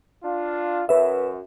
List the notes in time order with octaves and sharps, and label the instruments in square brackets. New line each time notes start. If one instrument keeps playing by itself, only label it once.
[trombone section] D4 F4
[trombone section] F#2 [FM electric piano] B4 E5